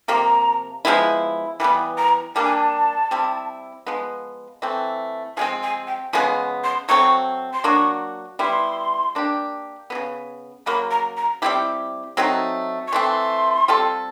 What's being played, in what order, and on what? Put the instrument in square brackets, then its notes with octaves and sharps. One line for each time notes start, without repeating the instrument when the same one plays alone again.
[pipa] C3 F3 A#3 [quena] A#5
[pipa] F3 G#3 B3 E4
[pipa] E3 G3 B3 [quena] B5
[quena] A#5
[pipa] G3 A#3 D4 [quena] A5
[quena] G#5
A5
[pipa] G3 C4 E4
F3 G#3 B3
E3 A3 C4
[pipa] F3 G#3 C4 [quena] G#5
[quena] G#5
G5
[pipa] C#3 F3 G#3 B3 [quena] G#5
[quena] C6
[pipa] F#3 A3 C4 [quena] C#6
[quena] C6
[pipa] F#3 A#3 D4 F#4 [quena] C#6
[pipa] G3 B3 E4 [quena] C6
[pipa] A#3 D4 G4
F#3 B3
C#3
[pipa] C#3 F#3 A#3 [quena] B5
[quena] A#5
A#5
[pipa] G3 C4 E4 G4
F#3 A3 C4 D#4
[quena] C#6
[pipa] E3 A3 C4 [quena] C6
[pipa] G3 C4 F4 A4